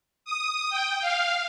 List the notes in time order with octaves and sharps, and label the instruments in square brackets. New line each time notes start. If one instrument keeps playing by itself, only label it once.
[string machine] D#6
G5
F5